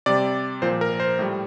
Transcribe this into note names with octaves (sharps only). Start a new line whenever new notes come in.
C3 G3 D5
A#2 F3 C5
A#4
C5
A2 G3